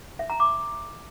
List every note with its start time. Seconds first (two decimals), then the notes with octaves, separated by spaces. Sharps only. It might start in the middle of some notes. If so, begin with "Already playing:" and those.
0.19 E5
0.30 A#5
0.40 D6